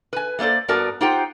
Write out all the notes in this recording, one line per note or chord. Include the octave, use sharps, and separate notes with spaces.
B4 G#5
A3 A#3 A4 C5 D5
G2 B3 F#4 A#4 D5 A5
D#4 F4 G4 C5 F#5 G5